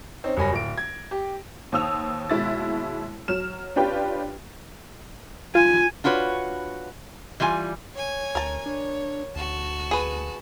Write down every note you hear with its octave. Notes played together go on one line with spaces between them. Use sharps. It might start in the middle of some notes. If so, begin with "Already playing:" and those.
C4 C#4 D#4
F#1 G3 C#4 G#5 B5 A#6
D1 D7
G#6
G4
D#2 C5 D#6 E6 F7
D#2 B2 G#3 E4 A6
F#3 F6 E7
C#4 D4 F4 G4 B4 G5
F4 G#5
D4 F4 F#4 B4 C#5
E3 G3 F4 G#5
C#5 G#5
D2 A#4 A5
D4 C#5
D2 F#4 A5
G#4 B4